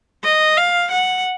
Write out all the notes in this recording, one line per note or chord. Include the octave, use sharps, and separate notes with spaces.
D#5
F5
F#5